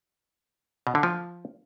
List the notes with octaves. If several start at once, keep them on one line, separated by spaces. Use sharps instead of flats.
B2
D3
F3